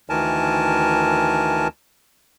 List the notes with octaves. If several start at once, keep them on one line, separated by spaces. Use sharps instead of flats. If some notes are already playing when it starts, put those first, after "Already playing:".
D2 D#3 E3 A#4 G#5 A5